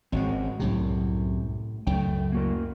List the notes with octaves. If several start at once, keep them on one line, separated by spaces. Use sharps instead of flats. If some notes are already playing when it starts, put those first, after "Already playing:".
G#1 G#3 C4 C#4 F#4
C2 F#2 A2 C3
C#2 F#2 A3 G5
A#3 F#4 A#4